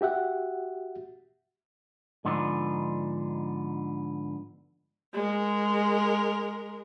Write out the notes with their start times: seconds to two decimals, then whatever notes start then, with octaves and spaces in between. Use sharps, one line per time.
0.01 F#4 G4 E5 F#5
2.25 G#2 D3 F3 B3 D4 D#4
5.14 G#3 A#4